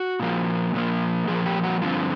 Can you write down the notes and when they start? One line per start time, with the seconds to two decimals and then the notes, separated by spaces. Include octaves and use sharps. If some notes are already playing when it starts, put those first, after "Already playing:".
Already playing: F#4
0.20 A#2 F3 A#3
0.74 A#2 F3 A#3
1.27 A#2 F3 A#3 G#4
1.46 G4
1.64 F#4
1.81 G2 D3 F3 C4 F4